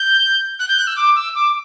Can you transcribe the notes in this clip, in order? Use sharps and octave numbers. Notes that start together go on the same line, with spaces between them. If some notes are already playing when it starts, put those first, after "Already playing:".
Already playing: G6
F#6
G6
F#6
E6
D6
E6
D6